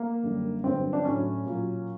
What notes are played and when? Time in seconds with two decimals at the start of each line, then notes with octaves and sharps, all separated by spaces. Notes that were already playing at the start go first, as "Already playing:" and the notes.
Already playing: A#3
0.23 F#2 D3 G3
0.64 G2 D3 F#3 C4
0.93 D4
1.05 A2 F#3 C#4
1.46 A#2 F#3